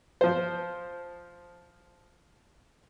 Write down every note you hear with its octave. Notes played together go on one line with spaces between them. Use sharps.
F3 C5